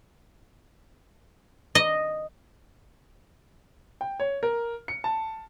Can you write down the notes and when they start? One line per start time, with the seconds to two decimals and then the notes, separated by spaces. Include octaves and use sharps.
1.75 D#5
4.01 G5
4.20 C#5
4.43 A#4
4.88 C#7
5.04 A5